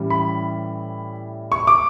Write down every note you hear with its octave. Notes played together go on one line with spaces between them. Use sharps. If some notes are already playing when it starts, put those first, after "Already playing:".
Already playing: A2 E3 G3 C#4
B5
C#6
D6